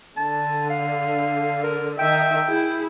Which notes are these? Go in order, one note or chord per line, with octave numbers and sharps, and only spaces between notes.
D3 A5
F5
A#4
D#3 D#4 E5 G5
E4 G#4